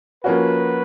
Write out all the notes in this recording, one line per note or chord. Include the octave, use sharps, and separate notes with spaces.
F3 A#3 C#4 F#4 B4